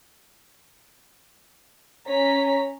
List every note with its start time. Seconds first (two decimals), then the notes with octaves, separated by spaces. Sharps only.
2.08 C#4 C#5 A#5 B6